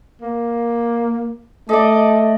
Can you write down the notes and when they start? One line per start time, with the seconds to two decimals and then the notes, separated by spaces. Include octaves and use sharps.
0.21 A#3
1.69 A3 A4 D5 D#5